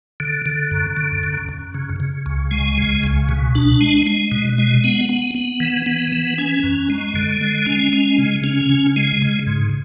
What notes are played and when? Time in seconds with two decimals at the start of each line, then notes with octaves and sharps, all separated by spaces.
0.20 D3
0.46 D3
0.71 F#2
0.97 D3
1.23 F#2
1.49 F#2
1.74 C#3
2.00 C#3
2.26 C#2
2.51 G#3
2.78 C#3
3.03 C#2
3.29 B2
3.55 D4
3.81 G#3
4.07 G#3
4.32 B2
4.58 G#3
4.84 B3
5.09 B3
5.35 B3
5.60 E3
5.86 B3
6.12 E3
6.38 C#4
6.63 F#2
6.90 G#3
7.16 D3
7.41 G#3
7.66 C#4
7.93 G#3
8.18 C#3
8.44 C#4
8.69 C#3
8.96 G#3
9.22 C#3
9.47 G#2